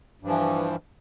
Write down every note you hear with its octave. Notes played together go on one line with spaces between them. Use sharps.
G2 E3 F3